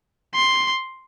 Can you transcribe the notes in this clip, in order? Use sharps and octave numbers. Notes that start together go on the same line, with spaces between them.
C6